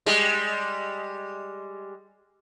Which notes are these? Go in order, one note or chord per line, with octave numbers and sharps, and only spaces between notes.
G3 G#3